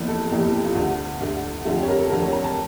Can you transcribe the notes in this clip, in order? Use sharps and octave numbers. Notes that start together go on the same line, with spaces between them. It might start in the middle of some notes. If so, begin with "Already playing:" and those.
Already playing: F1 E2 E3 A#3
A4
A4
F1 E2 E3 A#3 G4
A4
G4
F4
D2 D3 A3
D2 D3 A3
F2 D3 A3 F4
G4
C#5
A#4
A4
F2 D3 A3 A#4
C#5
A#5
A5